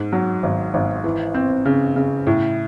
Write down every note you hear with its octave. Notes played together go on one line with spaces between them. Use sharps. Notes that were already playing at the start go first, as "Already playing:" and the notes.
Already playing: G#2
F#3
G#1
G#1
E3
C4
C#3
C#3
A2